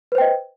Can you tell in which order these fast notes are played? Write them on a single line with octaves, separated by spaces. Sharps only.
B4 C5 G5 D#5